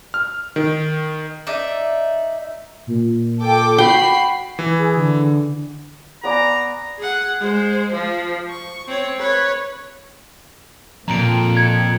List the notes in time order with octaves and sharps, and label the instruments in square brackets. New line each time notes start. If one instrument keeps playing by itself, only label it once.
[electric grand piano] F6
D#3
[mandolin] D#4 D5 E5
[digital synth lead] A#2
[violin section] A4 G5 D6
[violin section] F#4 B5 C7 [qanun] G5
[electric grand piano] E3
[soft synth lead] G#4
D3
[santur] B3 D5 G#5 [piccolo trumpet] A#5
[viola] G#4 F#5
G#3 C5
F3
C#6
C4 C#5
B4 C#5
[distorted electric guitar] F2 [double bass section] A#2 [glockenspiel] A#5 D7
[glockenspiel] A#5 G#6 C#7